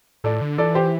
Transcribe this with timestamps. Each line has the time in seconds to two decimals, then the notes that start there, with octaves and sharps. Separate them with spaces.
0.24 A2 A4 D5
0.41 D3
0.58 E3 A4 D5
0.75 G4 C5